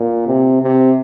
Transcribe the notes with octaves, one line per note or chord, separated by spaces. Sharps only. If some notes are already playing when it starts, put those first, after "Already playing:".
Already playing: A#2
C3
C3